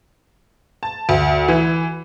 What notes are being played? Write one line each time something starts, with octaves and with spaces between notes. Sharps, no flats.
A5
D2
E3